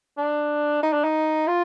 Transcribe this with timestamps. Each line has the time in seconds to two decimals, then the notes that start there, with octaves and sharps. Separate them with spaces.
0.17 D4
0.83 D#4
0.93 D4
1.04 D#4
1.47 F4